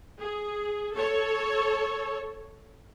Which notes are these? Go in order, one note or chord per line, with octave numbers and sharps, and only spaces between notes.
G#4
A4 C#5